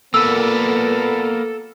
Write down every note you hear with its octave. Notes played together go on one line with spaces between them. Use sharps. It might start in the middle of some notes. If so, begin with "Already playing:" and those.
A#2 A#3 B3 A4 B4 E6